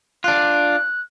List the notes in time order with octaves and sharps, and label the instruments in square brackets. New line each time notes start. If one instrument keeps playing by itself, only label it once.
[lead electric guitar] D4 F4 [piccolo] F#6